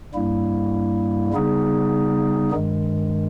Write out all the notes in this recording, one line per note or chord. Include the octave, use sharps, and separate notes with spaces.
G2 G3 A#3 E4
C#3 G3 B3 D#4 G#4
G2 D#3 G#3